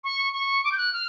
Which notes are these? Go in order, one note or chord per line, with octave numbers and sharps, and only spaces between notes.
C#6
C#6
D6
G6
F#6
F6